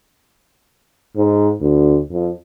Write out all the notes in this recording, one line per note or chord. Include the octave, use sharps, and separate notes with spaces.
G#2
D2
F2